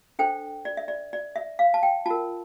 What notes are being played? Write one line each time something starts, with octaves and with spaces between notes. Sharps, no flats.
D4 A4 C5 G5
D5
E5
D5
D5
E5
F5
A5
G5
F4 A#4 A5